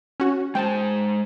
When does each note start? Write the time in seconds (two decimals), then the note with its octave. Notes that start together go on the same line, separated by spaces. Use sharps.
0.20 C#4 F#4
0.55 G#3 C5 G5 A5